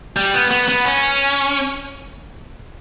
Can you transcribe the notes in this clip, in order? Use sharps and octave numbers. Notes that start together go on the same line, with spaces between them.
G3
B3
B3
B3
C#4